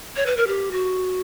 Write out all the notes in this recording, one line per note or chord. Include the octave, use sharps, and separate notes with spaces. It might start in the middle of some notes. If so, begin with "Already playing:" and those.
C#5
B4
A#4
G4
F#4